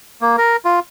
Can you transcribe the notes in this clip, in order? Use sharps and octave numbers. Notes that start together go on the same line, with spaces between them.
A#3
A#4
F4